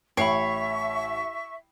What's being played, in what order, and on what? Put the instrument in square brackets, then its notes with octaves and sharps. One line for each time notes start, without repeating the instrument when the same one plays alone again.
[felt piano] A1 C7 [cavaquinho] C#5 [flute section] E5 C#6 [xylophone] G5 B5